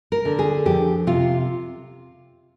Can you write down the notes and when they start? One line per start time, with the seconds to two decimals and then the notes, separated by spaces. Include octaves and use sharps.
0.12 A#4
0.25 D3
0.39 G#4
0.65 F2 G4
1.07 C3 F4